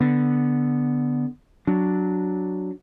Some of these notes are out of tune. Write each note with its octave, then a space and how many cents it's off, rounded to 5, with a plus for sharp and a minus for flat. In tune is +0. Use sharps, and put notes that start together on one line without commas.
D3 +0 B3 +0
F#3 +0 D4 +0